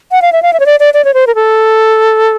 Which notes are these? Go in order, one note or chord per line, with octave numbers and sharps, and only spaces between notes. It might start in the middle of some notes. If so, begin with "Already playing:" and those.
F#5
F5
E5
F5
E5
C#5
D5
D5
D5
C#5
C5
A#4
A4